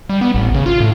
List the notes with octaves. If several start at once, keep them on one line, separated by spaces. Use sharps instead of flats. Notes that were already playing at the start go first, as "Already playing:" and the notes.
G3
B3
A1
C#3
F4
A2